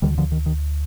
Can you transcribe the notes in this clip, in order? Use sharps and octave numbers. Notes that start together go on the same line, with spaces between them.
D2 D3 D#3 G3
D3 F3
D#3
D#3